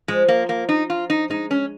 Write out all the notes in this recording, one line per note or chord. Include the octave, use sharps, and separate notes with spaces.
F3 G#3
A#3
A#3
D#4
F4
D#4
G#3 D#4
C#4